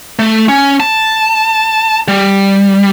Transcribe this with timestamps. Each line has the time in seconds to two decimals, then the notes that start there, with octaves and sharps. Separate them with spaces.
0.19 A3
0.48 C#4
0.80 A5
2.08 G3